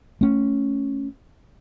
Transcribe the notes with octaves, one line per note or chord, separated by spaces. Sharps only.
A3 C#4